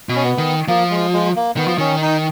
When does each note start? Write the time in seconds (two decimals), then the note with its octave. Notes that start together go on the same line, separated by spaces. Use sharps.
0.09 B2
0.16 C#4
0.23 B3
0.38 D#3
0.68 F3 A#3
0.91 G#3
1.13 G#3
1.36 A#3
1.57 D#3 B3
1.67 F3
1.78 D#3 C#4
2.02 D#4